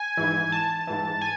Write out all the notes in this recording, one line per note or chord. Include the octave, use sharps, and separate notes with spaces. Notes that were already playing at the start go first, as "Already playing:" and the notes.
Already playing: G#5
G#2 E3
A5
G#2 E3
G#5